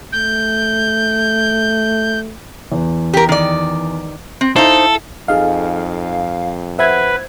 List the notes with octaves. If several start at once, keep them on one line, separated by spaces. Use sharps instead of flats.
A3 G6
E2
G4 A#4
D#3 D5
C4
D#4 E4 A4 C5 F5 E6
F2 D#4 G#4 A4 F5
B4 C5 E5 F#5 G#6